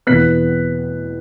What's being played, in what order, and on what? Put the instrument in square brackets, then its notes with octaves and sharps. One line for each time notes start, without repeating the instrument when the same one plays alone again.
[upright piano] E2 B2 B3 F#6 B6